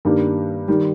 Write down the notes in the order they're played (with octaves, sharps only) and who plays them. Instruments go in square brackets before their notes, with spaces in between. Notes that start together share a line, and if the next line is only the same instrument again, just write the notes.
[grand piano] G2 D#3 G3 A#3
D#3 G3